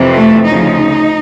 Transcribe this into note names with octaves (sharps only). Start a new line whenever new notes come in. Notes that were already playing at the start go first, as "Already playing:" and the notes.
Already playing: F2 C3 E3
A3
D2 C#3 F3 D#4